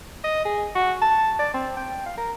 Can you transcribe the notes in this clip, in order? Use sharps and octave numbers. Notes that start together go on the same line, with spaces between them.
D#5
G#4
F#4
A5
D5
C4
G5
F5
A#4